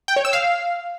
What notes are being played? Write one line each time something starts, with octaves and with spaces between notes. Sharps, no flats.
G5
C#5
E6
F5